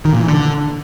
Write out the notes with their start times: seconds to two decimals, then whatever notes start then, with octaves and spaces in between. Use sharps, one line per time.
0.05 D#3
0.13 A#2
0.20 E3
0.28 D3